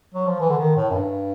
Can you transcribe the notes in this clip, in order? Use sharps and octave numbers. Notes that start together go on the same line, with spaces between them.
F#3
F3
E3
D3
D#3
A2
F#2
G2